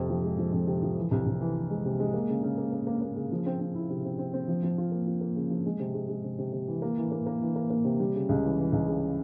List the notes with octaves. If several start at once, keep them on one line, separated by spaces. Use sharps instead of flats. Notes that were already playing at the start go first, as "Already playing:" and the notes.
Already playing: F2 C3
F3
G#3
F3
F2
C3
F3
E3
C2
C2
E3
E3
G#3
C3
G#3
A#3
C#3
C#3
A#3
A#3
A#3
A#3
C#3
F3
C4
C4
E4
C3
C4
C4
C4
F3
F3
F4
A#3
F3
A#3
C#3
F3
G#3
C3
G#3
G#3
C3
C3
C3
E3
A#3
E3
A#3
A#3
E3
A#3
A#3
C3
G3
C#3
C#2
E3
E3
C#2
C#3